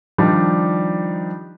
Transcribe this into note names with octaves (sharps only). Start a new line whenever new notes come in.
D#3 F3 G3 D4 D#4